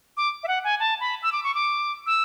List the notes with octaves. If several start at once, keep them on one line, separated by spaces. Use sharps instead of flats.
D6
E5
F#5
G#5
A5
B5
E6
D6
C#6
D6
E6